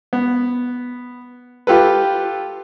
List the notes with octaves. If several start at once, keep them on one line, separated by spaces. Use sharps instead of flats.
B3
F4 G4 A4 B4